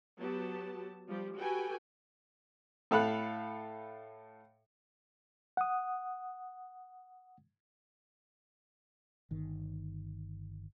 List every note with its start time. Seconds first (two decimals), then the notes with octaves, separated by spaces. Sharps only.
0.18 F#3 B3 G4 A5
1.08 F3 G3 G4
1.37 F#4 G4 A4 B4 G5 G#5
2.91 A2 A4 F5 B5 F#6
5.57 F#5 D#6
9.31 G1 D#3